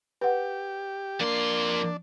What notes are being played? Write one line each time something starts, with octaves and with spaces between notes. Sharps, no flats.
G4 B4 F#5
F2 A#3 D4 C6